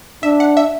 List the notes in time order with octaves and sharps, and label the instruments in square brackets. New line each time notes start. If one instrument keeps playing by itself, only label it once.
[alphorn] D4 [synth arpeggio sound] E5
[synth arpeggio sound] F#5
E5